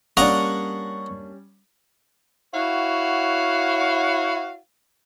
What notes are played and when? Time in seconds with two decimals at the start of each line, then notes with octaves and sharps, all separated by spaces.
0.17 G3 A#3 C#4 D4 D#5 F#5 A#5 C#6
2.54 E4 F#4 C#5 F5 F#5